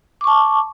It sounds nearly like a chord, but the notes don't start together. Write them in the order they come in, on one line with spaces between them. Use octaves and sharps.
D6 C#6 A5